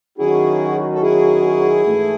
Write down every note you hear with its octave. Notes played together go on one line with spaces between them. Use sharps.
D#3 F#3 C#4 E4 F#4 G#4
A4
E4 G#4
G#2 E3 A3